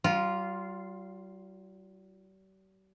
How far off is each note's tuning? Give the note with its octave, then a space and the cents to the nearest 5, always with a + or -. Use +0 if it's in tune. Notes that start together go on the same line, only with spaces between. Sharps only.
G3 -45 F4 -5